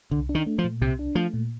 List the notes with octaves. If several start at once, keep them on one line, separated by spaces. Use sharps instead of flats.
C2 D3
D4
D#3
A3
F3
A#2
C2 C3
D4
F3 A3
A#2